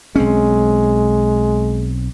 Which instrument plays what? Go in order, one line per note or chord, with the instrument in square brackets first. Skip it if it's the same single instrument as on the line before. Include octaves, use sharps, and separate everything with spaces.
[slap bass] B1 C4 C#4 [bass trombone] G#3